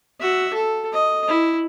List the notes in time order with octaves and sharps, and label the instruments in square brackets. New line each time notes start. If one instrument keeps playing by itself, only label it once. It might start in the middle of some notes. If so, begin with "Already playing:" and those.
[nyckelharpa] F#4 E5
A4
D#5
E4